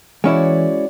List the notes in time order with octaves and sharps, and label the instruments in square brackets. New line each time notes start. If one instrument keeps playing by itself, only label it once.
[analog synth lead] E3 [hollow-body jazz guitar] G#3 C#4 E4 [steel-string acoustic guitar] F#4 C#5 D5